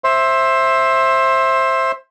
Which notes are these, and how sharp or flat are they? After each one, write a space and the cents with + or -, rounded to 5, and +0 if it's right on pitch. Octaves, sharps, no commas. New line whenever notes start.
C5 +20 E5 +0